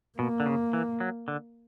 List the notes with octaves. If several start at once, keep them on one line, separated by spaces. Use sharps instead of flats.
B2 A#3
D3
C#3
E3
F#3
D3